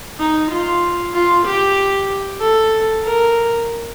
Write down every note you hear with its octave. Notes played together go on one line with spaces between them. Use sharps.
D#4
F4
F4
G4
A4
A#4